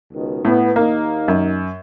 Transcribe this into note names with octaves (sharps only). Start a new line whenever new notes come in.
C#2 B2 D#3
A2 B3
D#2 A#3 D#4
F#2